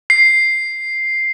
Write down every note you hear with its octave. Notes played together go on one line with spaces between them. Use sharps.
C7